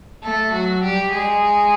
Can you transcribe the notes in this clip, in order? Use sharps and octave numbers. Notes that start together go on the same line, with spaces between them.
A3 A4
F#3 F#4
G3 G4
G#3 G#4